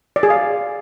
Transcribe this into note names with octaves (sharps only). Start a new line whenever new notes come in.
D5
G#4
F5